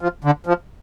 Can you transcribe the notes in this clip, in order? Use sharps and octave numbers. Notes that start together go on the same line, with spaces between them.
F3
D3
F3